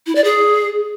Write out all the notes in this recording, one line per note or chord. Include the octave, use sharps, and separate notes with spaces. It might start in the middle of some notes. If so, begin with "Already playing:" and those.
E4
D5
G#4